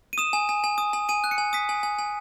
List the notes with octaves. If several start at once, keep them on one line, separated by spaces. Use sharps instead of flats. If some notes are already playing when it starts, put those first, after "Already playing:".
D#7
D#6 E7
G#5
G#5
G#5
D#6
G#5
G#5 D#7
F#6
C#7
G#5
D#6 B6
G#5
G#5
G#5